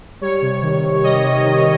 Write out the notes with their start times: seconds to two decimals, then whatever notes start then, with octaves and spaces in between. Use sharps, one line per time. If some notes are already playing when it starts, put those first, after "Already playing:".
0.21 G3 C#5
0.42 C3
0.62 D#3
0.83 C3
1.04 G3 D#5
1.24 C3
1.45 D#3